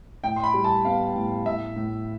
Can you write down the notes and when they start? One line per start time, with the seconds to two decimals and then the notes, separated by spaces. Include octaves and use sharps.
0.24 A2 G5
0.36 C6
0.44 B5
0.54 G3
0.64 A5
0.85 B3 F5
1.15 A2
1.46 A2 E5
1.76 A2